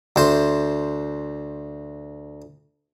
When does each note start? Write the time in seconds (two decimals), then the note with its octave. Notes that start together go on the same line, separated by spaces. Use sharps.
0.16 D2 C5